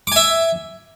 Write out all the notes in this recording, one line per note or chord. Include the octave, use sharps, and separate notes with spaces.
E5 G#5 D6